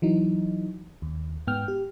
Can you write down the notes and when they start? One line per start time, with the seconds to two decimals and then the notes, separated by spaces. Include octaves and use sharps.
0.02 E3 F#3 D#4
1.02 D#2
1.47 G#2 B3 G5 F6
1.68 G4